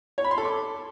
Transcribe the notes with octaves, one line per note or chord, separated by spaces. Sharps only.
C#5
B5
C6
A4
D6